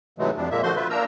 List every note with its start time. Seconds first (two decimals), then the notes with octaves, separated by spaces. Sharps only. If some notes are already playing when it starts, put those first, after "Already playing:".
0.19 G#2 C3 E3 F#3 G#3 A3
0.37 F2 F3 G3 D4
0.51 A#2 G#3 A#3 E5
0.63 D3 F3 A3 F#4 C5 C6
0.75 F4 B4 E5
0.90 A#3 D4 A#4 A#5 E6